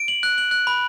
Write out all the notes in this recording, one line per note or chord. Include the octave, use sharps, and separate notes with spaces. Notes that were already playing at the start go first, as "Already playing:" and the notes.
Already playing: D7
F#7
F#6
F#7
F#6
B5